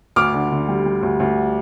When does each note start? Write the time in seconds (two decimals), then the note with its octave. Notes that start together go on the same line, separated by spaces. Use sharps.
0.16 D2 D6 F6
0.33 D3
0.51 D3
0.68 G3
0.86 G3
1.03 D2
1.20 D2